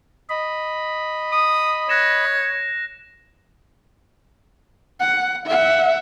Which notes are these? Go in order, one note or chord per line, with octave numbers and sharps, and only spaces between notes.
D#5 B5
D#6
C#5 F#6 A#6 E7
F#5
E5 F#5